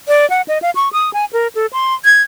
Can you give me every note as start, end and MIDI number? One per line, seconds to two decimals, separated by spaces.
0.08 0.28 74
0.30 0.42 78
0.48 0.58 75
0.62 0.71 77
0.75 0.89 85
0.93 1.12 87
1.13 1.25 80
1.33 1.48 70
1.55 1.66 69
1.73 1.94 84
2.05 2.22 92